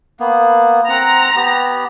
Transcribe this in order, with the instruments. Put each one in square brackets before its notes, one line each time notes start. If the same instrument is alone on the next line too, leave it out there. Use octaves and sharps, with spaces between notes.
[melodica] A#3 B3
[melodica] C4 F#5 [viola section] A#5
[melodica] B3 G4